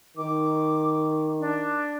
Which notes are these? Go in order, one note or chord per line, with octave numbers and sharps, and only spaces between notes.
D#3 D6
D4